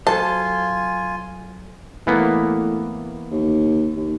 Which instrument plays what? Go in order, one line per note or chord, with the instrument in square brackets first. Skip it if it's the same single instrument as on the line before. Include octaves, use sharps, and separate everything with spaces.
[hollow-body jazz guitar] F#3 A4 C5 [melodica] F4 G#5 [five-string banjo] A5
[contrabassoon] A2 [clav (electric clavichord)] E3 A#3 B3
[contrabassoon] D#2
D#2